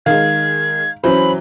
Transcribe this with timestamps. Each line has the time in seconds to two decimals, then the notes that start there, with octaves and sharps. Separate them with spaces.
0.06 D#3 G#3 F5 G#6
1.04 E3 F#3 C#4 C5 B5